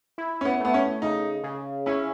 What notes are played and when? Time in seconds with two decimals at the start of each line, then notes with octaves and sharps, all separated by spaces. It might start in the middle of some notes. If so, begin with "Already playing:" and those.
0.18 E4
0.41 C#4
0.45 B3
0.60 A3 B3
0.74 C#4
1.02 C#3 D#4
1.44 C#3
1.86 C#4 E4